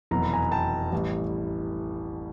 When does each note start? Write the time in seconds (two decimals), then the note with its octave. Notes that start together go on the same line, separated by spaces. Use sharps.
0.11 F1 E2 B2 F#3 A#5
0.22 B5
0.33 G#5 A#5
0.52 G5 A5
0.92 A1 A2 E3 G3